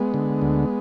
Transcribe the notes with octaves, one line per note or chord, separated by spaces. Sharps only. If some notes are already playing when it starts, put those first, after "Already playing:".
Already playing: G#3 B3
D3
D2